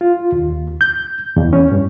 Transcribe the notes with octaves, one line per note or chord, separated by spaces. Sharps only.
F4
D#2
G6
E2
C#4
G2